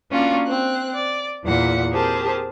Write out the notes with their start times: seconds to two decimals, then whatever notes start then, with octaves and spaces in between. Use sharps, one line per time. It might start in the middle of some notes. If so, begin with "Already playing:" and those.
0.12 A#3 C#4 D4 F4 F#4
0.47 C4 F#6
0.94 D5
1.44 E2 A#2 F#5
1.93 C4 G4 G#4 A#4 C5 A5